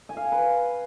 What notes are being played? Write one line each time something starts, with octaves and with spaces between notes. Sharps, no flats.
G#5
F5
G#5
B4